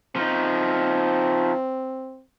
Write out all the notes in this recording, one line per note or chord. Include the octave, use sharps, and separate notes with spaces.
F3 C4 D#4